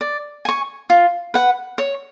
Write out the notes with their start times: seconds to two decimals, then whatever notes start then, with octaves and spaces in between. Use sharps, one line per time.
0.01 D5
0.45 G#5 C#6
0.90 F4
1.34 B4 F#5
1.78 C#5